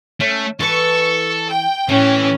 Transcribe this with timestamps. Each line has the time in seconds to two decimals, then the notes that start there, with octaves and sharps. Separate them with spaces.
0.20 A3 C#4
0.60 E3 A4 B4 C#6
1.49 G5
1.89 A2 E3 C#4